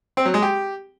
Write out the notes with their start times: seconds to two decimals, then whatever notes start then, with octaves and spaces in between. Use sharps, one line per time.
0.17 C4
0.26 F#3
0.34 G#3
0.42 G4